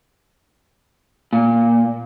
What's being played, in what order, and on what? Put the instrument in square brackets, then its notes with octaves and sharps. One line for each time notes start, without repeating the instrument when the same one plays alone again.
[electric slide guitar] A#2